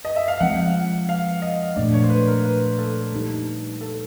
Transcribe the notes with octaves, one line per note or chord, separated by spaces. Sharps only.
D#5
E5
F5
F3 G#3 C4 F#5
F5
D#5
A#2 F3 A3 D4 D5
C#5
C5
B4
A#4
B4
A4
G3 A#3 D#4 G4
A4